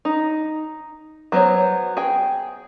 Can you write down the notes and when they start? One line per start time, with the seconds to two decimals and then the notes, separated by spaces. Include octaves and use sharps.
0.05 D#4
1.32 F#3 B3 C5 C#5
1.97 G#4 G5